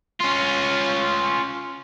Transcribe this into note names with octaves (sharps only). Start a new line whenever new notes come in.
C#4 F4